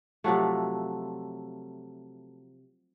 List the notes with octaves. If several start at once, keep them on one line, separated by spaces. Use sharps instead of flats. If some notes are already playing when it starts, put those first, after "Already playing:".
C3 F3 F#3 A3